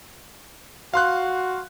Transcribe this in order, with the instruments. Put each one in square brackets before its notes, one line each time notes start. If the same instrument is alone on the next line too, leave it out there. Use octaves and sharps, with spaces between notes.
[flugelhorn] F#4 [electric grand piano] F5 C6 F#6